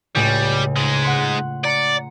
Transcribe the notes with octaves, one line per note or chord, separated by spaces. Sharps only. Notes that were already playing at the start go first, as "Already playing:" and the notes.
C#2 A2 C#3 G3
G#2 G#3
F#5 C6 B6
D5 A#5 C#7